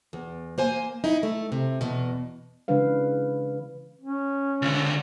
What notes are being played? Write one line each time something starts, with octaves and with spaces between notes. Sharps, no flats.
E2
A#3 C5 G#5
D#4 E4
A3
C3
E2 B2
C#3 E3 G#3 D4 B4 F5
C#4
C#2 D3